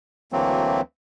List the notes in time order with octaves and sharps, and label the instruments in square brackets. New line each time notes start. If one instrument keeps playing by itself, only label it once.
[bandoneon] D2 E3 F#3 A3 A#3 C4